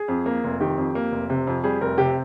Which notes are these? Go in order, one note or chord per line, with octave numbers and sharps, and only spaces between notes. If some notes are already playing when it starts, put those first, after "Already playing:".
Already playing: G#4
F2
A#3
F1
D#3 G4
F2
A#3
F1
C3
F2
G3 G#4
F1 A#4
C3 G4